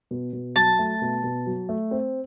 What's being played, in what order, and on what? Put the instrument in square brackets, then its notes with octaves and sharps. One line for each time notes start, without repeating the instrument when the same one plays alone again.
[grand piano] B2
B2
[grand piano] F#3 [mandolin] A5
[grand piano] A3
B2
B2
F#3
A3
C4